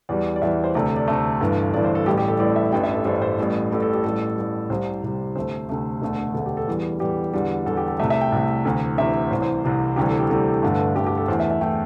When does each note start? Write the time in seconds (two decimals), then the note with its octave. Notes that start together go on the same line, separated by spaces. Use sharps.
0.09 E2 E3 G3 D5
0.36 D5
0.42 E2 E3 G3 E5
0.64 C5
0.75 D2 C3 A3 D5
0.86 A4
0.96 D5
1.08 D2 C3 A3
1.41 G1 G2 E3
1.74 G1 G2 E3 D5
1.84 C5
1.95 A4
2.06 A1 A2 G3 G4
2.17 G4
2.28 A4
2.39 A1 A2 G3 D5
2.56 E5
2.72 A1 G2 G3 G5
2.83 E5
2.94 A4
3.05 A1 G2 G3 C5
3.22 C5
3.38 A1 A2 G3
3.71 A1 A2 G3 A4
3.82 A4
3.93 G4
4.04 A1 A2 G3 A4
4.37 A1 A2 G3
4.70 C2 C3 G3 C5
5.03 C2 C3 G3
5.36 D2 C3 A3 C5
5.69 D2 C3 A3
6.02 E1 D2 D3 A3
6.34 E1 D2 D3 A3 A4
6.46 G4
6.57 A4
6.67 E2 E3 G3
7.00 E2 E3 G3 G4
7.33 E2 D3 G3
7.66 E2 D3 G3 A4
7.77 G4
7.88 A4
7.99 C2 C3 A3 E5
8.10 E5
8.21 G5
8.32 C2 C3 A3
8.65 D2 C3 E3
8.98 D2 C3 E3 E5
9.31 C2 C3 E3 C5
9.42 C5
9.64 C2 C3 E3
9.96 D2 C3 E3 G3 G4
10.08 A4
10.19 G4
10.30 D2 C3 E3 G3 A4
10.63 G1 G2 D3 A3
10.95 G1 G2 D3 A3 G4
11.07 G4
11.18 A4
11.28 E2 E3 A3 C5
11.40 E5
11.51 E5
11.61 E3 A3 G5